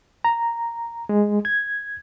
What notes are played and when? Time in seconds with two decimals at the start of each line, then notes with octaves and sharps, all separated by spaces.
0.24 A#5
1.09 G#3
1.45 G#6